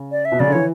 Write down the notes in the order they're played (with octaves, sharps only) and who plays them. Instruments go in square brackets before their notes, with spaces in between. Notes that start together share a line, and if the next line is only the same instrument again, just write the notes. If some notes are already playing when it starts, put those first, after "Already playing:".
Already playing: [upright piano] C#3
[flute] D5
E5
[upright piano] B2
[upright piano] C#3 [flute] D5
[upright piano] D3
[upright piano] E3 [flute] C#5